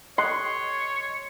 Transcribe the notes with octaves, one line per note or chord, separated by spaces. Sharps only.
C#5 D#5 C6 F#6